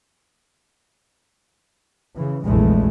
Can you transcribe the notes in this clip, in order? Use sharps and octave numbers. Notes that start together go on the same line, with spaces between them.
C#3 E3
F1 A#1 E2 E3 G#3 A3